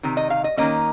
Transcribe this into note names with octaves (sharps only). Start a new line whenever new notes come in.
C3 D#3
D#5
F5
D#5
D#3 A#3 C#4 D#5